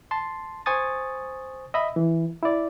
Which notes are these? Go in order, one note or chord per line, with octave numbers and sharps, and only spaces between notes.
A5 C6
C5 G#5 C#6 D#6 A6
D#5 E5 B5
E3
E4 D5